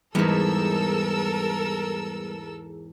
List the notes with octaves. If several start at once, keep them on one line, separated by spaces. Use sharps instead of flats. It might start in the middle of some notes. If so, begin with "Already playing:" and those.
E2 G#2 G3 B3 D#4 A4 A#4 E6